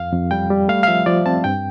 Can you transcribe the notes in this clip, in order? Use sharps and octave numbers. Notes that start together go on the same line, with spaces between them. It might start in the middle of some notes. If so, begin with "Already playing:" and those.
Already playing: F2 F5
F2
G3 G5
G3
A3 F5
F5
F3 E5
F3 D5
C4 A5
G2 G5